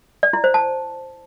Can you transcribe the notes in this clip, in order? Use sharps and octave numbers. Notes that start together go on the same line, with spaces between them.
D5
E4
C5
A5